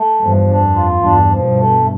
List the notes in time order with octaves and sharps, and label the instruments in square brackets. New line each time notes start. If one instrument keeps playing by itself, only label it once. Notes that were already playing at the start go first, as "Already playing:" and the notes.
Already playing: [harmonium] A3
[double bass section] E2 G2 [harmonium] F3
[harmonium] D4
[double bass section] F2
[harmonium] F4
[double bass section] E2 G2 [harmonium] D4
[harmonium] F3
[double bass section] G2 B2
[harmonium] A3